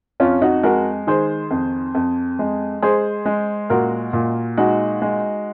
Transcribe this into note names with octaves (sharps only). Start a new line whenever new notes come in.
F2 C#4 F4
D#4 F#4
G#3 F#4 A#4
D#3 G#4 C5
F2
F2
G#3
G#3 G#4 C5
G#3
A#2 F#4 A#4
A#2
G#3 D#4 F#4
G#3